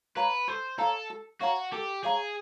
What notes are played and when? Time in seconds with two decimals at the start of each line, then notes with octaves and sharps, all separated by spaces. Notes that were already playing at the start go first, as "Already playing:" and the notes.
0.16 B4 C#5 F5 A#5
0.48 A4 C5
0.78 A4 C#5 F5 A#5
1.10 A4
1.40 F#4 C#5 F5 A#5
1.72 G4 A4
2.03 G#4 C#5 F5 A#5